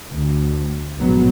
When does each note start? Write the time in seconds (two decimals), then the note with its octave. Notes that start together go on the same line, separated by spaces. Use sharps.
0.12 D2
0.99 A#1 G#2 B2 F#3 B3